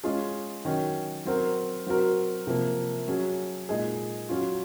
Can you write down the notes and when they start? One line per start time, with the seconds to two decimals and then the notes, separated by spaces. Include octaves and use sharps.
0.04 G#3 C#4 F4 G#4
0.65 D#3 F#3 C#4
1.25 F#3 C4 F#4 A#4
1.87 F#3 C4 F#4 A#4
2.47 C3 F3 A#3
3.07 F#3 C#4 G#4
3.69 A#2 G#3 D#4 G#4
4.29 F#3 C#4 F4